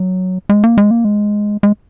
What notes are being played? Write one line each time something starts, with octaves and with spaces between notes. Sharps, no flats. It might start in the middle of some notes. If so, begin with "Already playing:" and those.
Already playing: F#3
G#3
A#3
G#3
A#3
G#3
G#3